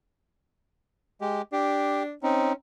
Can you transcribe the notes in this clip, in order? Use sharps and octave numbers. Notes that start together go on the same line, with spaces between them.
G#3 G4
D4 G4
C4 C#4 D#4